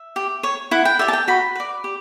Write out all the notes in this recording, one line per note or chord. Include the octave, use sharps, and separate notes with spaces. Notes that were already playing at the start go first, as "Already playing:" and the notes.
Already playing: E5
G4
C#5
E4 F#5
G5
G4 D5 E5
A5
G5
F#4 B5
B4 D5
G4